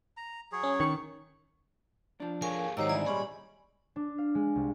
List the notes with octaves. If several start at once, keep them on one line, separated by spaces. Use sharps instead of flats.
A#5
F#3 G#4 C#5
C#4
D#3 C#6
F3 D4
G#3 A#3 A#4 C#5 F5 G#5
G#2 D#3 F#3 D#4 G4 C5 F#5 E6
D3 G3 E4 D5 G#5
A#2 G3 G#3 C#4 C#5 B5
D4
F5
G#3
C2